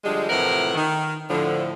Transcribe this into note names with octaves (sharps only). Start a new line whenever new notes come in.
D3 F3 G3 G#3
A2 C3 E3 F3 A#4 F#5
D#3
A2 D3 F3